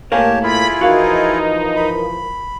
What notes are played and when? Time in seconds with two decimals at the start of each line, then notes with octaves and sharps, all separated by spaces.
0.12 A2 A#3 G4 A#4 C#5 F5 G#5 A5
0.43 E4 F4 G#4 B5
0.81 E3 F3 D#4 F#4 A#4 F5
1.76 B5